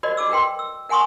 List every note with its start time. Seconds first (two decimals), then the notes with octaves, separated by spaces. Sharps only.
0.03 F#4 A#4 C5 D5 D#5
0.17 F#4 A4 D6 E6
0.30 F#4 A#4 B4 G5 C6
0.59 E6
0.89 A#4 F#5 G#5 C6 C#6 D#6